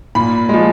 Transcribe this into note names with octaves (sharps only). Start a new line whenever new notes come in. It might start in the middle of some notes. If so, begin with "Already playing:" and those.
A#2 B5
F3 G#3